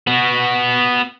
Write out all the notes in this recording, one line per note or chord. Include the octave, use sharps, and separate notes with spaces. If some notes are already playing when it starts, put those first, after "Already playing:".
B3 F#4